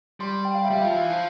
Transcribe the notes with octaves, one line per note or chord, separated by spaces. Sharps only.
G3 C6
G5
F5
E5
G3 F5
F3
E3
F3